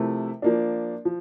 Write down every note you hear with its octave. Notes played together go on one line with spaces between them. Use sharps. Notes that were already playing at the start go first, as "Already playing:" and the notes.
Already playing: C3 F3 A3 E4 A#4
F3 A#3 D4
F3